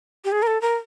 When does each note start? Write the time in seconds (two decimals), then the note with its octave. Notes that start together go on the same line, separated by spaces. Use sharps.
0.25 G4
0.32 G#4
0.42 A#4
0.47 A4
0.62 A#4